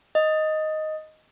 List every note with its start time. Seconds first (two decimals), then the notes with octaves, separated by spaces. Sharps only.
0.15 D#5